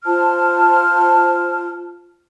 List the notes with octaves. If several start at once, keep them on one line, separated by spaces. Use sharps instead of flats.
F4 C5 A5 F6